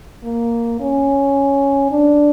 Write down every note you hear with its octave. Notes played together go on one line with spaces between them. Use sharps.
A#3
C#4
D4